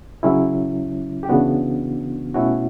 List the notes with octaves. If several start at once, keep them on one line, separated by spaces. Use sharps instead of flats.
C#3 F#3 C#4 E4
G4
C#3 E3 B3 D4 F#4
B2 A3 C#4 E4 F#4